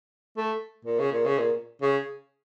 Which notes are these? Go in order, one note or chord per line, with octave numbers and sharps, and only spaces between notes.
A3
A#2
C#3
A#2
C#3
A#2
C#3